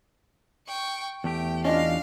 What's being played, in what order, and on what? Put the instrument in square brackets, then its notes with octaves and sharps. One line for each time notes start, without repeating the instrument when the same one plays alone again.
[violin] G5 C#6
[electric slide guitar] E2 A3 G4 [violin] G5
[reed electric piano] C#4 D4 F4 [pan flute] D#5 [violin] F5